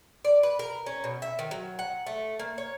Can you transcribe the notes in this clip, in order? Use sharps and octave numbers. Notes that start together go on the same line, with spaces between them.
D5
B4
A#4
C#4
B2
E5
D#3
F#3
F#5
A3
A#3
C#5